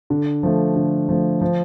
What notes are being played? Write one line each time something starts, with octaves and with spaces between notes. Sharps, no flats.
D3
F3 A3
D3
F3 A3
F3